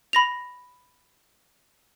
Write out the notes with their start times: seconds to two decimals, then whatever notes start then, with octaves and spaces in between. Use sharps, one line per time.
0.13 B5 A#6 F7